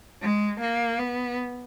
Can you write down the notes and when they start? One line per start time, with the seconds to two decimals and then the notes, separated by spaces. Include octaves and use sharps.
0.22 G#3
0.61 A#3
0.99 B3